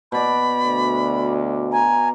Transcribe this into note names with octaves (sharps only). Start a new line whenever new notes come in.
B2 D5 B5
D2
G#5 A#5